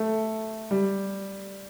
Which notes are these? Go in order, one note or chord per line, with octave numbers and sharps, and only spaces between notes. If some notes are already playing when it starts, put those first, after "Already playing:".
Already playing: A3
G3